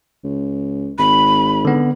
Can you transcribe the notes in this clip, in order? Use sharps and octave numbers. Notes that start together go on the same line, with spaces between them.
C#2
G#1 B5
D3 B3